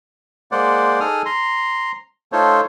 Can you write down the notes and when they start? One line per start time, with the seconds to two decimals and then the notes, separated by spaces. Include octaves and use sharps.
0.52 G#3 A#3 C5 D5 F#5
1.00 D#4 G#4 A4 D#6 F6
1.25 A#5 C6
2.32 A3 D#4 F4 A4 C5 C#5